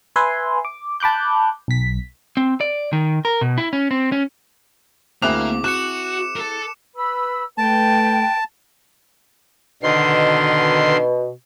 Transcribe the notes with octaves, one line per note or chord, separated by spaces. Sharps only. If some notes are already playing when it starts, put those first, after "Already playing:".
B4 E5 G#5 C6
D6
A5 B5 D6 F#6 G6
B1 B6
C4
D5
D#3
A#4
B2
E4
C#4
C4
C#4
D2 A#3 C4 E4 G#4 D6 F#6 F7
F#4 F#6 C#7 E7
A4 A#4
B4 B5 E6
A3 B4 G5 A5
B2 D3 D#3 C6